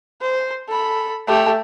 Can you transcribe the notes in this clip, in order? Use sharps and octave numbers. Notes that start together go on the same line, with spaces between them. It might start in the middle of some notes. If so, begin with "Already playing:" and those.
C5
A4 B5
A3 G4